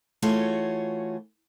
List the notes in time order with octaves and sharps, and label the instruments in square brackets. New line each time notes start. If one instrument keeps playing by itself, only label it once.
[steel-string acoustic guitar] E3 A3 F4 F#4 G#4 C#5